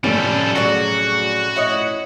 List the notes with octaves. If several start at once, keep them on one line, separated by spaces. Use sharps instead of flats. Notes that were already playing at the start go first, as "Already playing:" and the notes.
F1 A2 F3 G3 C#4 A4
F#3 F#4 G#4 D5
E4 C#5 D#5